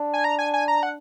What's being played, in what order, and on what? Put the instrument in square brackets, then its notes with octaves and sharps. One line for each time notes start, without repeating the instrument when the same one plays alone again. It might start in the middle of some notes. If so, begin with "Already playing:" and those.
Already playing: [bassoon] D4
[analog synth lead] G#5
A#5
G#5
G#5
A#5
F#5